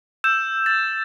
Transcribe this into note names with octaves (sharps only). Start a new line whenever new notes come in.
E6 G6 E7
A6